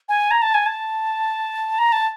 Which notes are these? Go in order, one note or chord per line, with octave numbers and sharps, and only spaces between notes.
G#5
A#5
A5
G#5
A5
A#5
A5